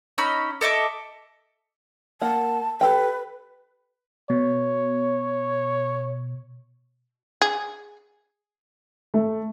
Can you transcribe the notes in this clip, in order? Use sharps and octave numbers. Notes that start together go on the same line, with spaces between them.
C#4 D#4 B5 E6
A4 D#5 E5 D6
A#3 F#5 A5
G4 A4 B4 G5
B2 C#5
G#4
A3